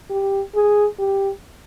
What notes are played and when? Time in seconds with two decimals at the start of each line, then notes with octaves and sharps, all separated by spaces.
0.11 G4
0.55 G#4
0.99 G4